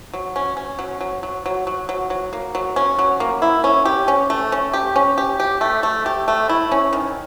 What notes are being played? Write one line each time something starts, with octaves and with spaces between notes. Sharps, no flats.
F#3
C#4
C#4
F#3
F#3
F#3
F#3
F#3
F#3
F#3
A#3
F#3
C#4
F#3
A#3
E4
C#4
G4
C#4
A3
C#4
G4
C#4
G4
G4
A3
A3
G4
A3
E4
C#4
D#3